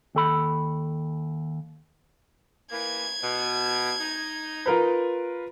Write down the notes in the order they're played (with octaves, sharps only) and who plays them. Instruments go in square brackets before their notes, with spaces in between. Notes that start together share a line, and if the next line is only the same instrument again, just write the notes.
[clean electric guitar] D#2 A4 B5
[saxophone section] E3 A#3 [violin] G#6
[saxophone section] B2
D#4
[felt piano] F4 A#4 B4